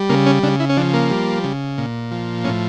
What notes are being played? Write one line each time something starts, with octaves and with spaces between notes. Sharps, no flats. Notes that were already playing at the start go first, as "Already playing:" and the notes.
Already playing: G3
C#3 A#3
C#4
C#3 D4
E4
C#4
F3 D4
A#3
G3
C#3
A#2
F3
A2 C#4